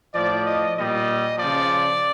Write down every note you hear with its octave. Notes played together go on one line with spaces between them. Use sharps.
A2 F3 D5
D#5
A#2 G3 D#5
C#3 F3 D5